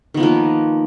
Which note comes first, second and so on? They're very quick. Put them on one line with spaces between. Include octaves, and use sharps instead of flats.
D#3 B3 F3 A#3